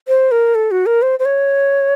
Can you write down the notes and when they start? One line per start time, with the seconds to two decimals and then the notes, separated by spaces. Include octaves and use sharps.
0.08 C5
0.31 A#4
0.55 A4
0.71 F#4
0.86 A#4
1.02 C5
1.19 C5
1.25 C#5